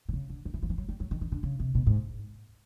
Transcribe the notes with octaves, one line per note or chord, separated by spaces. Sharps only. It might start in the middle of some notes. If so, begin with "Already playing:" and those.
C3
C#3
D3
D#3
E3
F3
E3
F#3
G3
F#3
D#3
D#3
D3
C#3
C3
B2
G#2